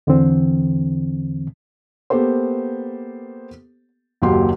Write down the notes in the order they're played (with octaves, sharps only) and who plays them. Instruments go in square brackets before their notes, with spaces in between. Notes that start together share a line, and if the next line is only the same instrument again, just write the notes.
[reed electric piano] E2 D3 E3 C4
[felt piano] A#3 B3 G4 A4 C5
F#1 D#2 F#3 G4 C6